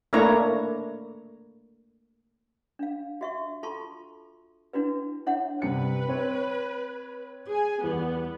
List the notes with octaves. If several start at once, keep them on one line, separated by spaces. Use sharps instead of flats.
A3 A#3 D4 E4 C#5 A#5
D4 F5
F#4 E5 C#6
F4 A4 A5 C6 C#6
D4 E4 F#4 B4
D4 E4 C#5 E5 F#5
G2 C3 B4 C#7
C4 C#5
G#4 G#5
E2 G3 B3